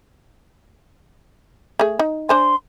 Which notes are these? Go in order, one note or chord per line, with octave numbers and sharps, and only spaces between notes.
A3 G#4
D#4
D4 C5 G#5 C6